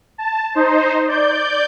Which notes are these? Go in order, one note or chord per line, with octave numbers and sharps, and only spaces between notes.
A5
D#4 C5
D5 G6